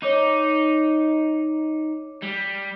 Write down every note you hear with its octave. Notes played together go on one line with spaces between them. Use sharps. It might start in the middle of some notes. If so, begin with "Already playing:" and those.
D#4 C#5 D6
G3